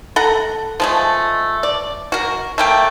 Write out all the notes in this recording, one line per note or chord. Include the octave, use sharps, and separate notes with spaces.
A4 F#5 A#5
F3 G#3 A3
D5
F#4 A#4
A3 A#3 G5